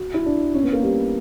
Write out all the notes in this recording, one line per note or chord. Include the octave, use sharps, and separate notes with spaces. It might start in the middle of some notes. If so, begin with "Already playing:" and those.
Already playing: F#4
E4
D4
C#4
B3
A#3
G3